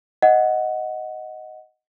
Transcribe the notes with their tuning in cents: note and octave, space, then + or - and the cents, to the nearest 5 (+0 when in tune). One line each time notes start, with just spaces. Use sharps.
D#5 +5 F#5 +0